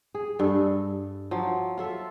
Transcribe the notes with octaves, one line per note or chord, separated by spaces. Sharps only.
G#4
G2 A4
F3 F#3
F4 A4 E5